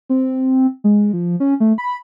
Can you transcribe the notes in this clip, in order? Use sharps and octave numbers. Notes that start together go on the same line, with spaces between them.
C4
G#3
F3
C#4
A3
B5